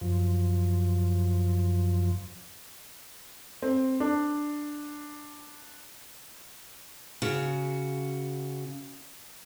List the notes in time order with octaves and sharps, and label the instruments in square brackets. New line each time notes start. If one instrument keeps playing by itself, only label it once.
[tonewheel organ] F#2 F3
[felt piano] C4
D4
[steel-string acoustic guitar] C#3 F#4